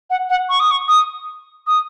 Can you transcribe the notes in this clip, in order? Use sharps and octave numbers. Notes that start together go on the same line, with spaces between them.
F#5
F#5
C#6
D#6
C#6
D#6
D#6